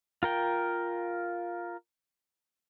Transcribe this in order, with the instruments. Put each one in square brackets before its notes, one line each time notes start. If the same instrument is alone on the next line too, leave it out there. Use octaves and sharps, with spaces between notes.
[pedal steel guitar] F4 A#4 G5